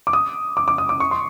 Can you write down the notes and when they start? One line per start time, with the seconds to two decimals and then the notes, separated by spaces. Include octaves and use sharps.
0.07 D6
0.13 D#6
0.57 D6
0.68 D6
0.78 D#6
0.89 D6
1.00 C#6
1.11 C6